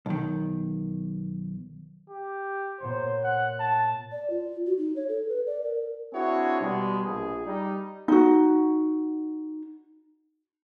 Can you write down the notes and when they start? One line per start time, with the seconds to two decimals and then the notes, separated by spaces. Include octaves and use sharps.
0.06 B1 D#3
2.10 G4
2.80 A#2 B3 C5 C#5
3.24 F#5
3.60 A5
4.12 D5
4.30 F4
4.67 F#4
4.78 D#4
4.96 C#5
5.09 A4
5.28 B4
5.47 D5
5.64 A#4
6.13 C4 D4 E4 F#4 G#4 C#5
6.61 B2 G3 G#3
7.06 A#1 G#4
7.46 G3 D#4
8.08 D#4 F#4